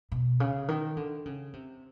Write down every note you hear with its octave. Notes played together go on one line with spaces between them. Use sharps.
B2
C#3
D#3
D3
C#3
C3